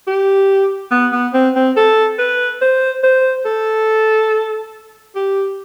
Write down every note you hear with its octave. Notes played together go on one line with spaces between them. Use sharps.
G4
B3
B3
C4
C4
A4
B4
C5
C5
A4
G4